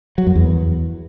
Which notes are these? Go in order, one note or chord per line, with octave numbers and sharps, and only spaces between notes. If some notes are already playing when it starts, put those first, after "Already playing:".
F#3
F#2
E2